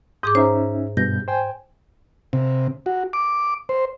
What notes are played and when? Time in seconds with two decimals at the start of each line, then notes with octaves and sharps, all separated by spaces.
0.23 G#2 G#4 D6 D#6 G6
0.35 C#4 D#4 C5 E5 A#5
0.97 G2 B2 G6 A#6
1.28 C5 G5 G#5
2.33 C3
2.86 F#4
3.13 D6
3.69 C5